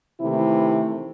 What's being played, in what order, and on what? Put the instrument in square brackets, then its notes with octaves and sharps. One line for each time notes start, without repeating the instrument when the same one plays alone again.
[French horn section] C3 D#3 E3 A3 E4